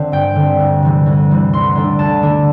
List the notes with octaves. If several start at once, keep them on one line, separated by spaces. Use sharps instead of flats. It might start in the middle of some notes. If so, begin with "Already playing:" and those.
Already playing: D3 C4
G2 G5
D3 C4
D2
C3 E3 G3
D2
C3 E3 G3
D2 C6
D3 A3 D4
D2 A5
D3 A3 D4